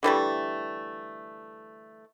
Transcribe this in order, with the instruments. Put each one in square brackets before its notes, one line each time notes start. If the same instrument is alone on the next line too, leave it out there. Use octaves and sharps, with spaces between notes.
[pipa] D3 E3 G3 A3